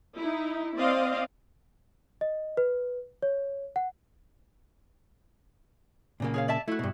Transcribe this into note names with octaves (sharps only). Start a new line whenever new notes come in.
D#4 E4
C4 D5 D#5 F5
D#5
B4
C#5
F#5
A#2 C#3 A#3
G#4 C#5 F5
D5 E5 A5
A3 E4 F#4
G2 B2